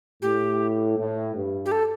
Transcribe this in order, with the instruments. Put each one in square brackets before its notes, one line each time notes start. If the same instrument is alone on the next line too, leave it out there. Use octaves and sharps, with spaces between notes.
[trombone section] A2 [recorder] G4
[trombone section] A2
G2
[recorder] G4
A4